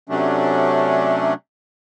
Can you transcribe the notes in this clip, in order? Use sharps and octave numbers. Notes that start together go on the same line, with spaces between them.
C3 F#3 A3 C#4 D4